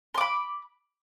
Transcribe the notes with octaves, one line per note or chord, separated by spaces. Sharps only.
B5 C6 D6